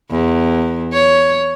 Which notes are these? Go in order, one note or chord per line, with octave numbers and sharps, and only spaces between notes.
E2
C#5